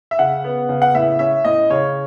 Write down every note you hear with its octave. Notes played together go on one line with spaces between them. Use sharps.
E5
C#3 F#5
B3
C#3
F#5
A2 E5
C#4 E5
A2 D#5
C#3 C#5